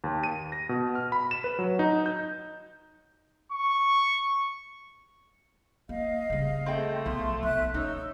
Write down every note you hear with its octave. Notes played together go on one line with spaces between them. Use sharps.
D#2
D#7
A#6
B2
F6
B5
E7
B4
F#3
D#4
G6
C#6
A#3 D#5 F5
C#3 G3
A3 C4 G#4 G5
B1 F3 C6
B1 E5 F#6
C#4 D#4 C#5 E6